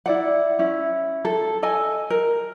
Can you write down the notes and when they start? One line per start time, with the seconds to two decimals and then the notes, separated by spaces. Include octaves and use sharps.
0.06 E4 D5 F#5
0.59 C#4 E4
1.25 A4
1.63 A4 D#5 G#5 A5
2.10 A#4